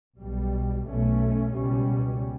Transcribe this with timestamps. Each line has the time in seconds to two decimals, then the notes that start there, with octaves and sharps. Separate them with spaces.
0.20 B1 B2 G3
0.88 B1 B2 A3 C#4
1.54 C#2 B2 G3 C#4